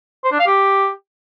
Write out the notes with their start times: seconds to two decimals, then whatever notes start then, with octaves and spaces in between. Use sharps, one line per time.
0.24 C5
0.32 D4
0.39 F5
0.47 G4